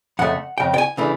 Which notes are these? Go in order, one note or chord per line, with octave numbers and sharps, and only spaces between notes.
F2 C#3 A3 F#5
F2 C#3 G5
G5
G#5
C#3 E3 A3 D4